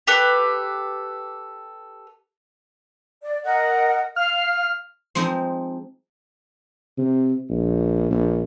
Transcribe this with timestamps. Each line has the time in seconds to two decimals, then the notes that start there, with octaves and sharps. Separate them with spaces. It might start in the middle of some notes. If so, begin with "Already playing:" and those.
0.07 G4 A4 B4
3.23 D5
3.44 A#4 D#5 F#5
4.16 F5 F6
5.15 F3 G#3 C4 D#4
6.98 C3
7.49 A#1
8.10 A#1